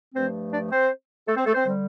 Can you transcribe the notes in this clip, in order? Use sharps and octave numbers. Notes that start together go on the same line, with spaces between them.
G2 F3 A3 C4 C5
D4 D5
C4 C5
A3 A4
C4 C5
A3 A4
C4 C5
D3 G3